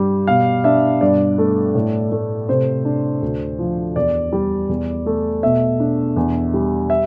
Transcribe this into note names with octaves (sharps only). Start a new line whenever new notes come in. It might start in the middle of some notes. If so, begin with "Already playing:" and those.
Already playing: G2 G3
B2 F5
D4 E5
G2 D5
A3
A2
A3
C3 C5
D4
D2
F3
E2 D5
G3
E2
A3
B2 E5
D4
E2
G3
E5